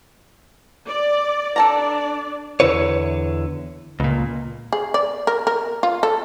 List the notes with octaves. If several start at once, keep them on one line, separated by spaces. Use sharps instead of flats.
D5
D4 A4 D5 A5 A#5
E2 B2 D3 E4 B4 C#5
C#2 A#2
G#4
D5
A#4
A#4
F4
A4